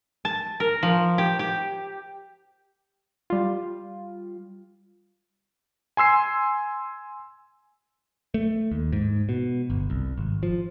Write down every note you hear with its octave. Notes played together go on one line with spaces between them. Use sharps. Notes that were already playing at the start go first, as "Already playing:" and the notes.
A5
A#4
F3
G4
G4
G3 F4
G#5 C6 E6 C7
A3
D#2
G#2
B2
G1
C2
G#1
F3